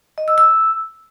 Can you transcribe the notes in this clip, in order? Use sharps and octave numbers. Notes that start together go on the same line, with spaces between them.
D#5
E6
E6